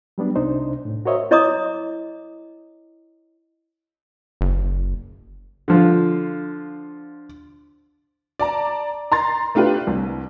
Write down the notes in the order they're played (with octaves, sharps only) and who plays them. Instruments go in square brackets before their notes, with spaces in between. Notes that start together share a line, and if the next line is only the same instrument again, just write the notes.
[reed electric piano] F#3 G3 B3 D4
C2 C3 D4 D#4 C5
A2
F#4 A#4 C5 C#5 D#5 E5
[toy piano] E4 C#5 D#5 A#5 D6 D#6
[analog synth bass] F#1
[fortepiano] D3 F3 F4
[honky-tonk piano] D5 A5 A#5
A#5 C6 A6
A3 D4 F4 G4 B4
C2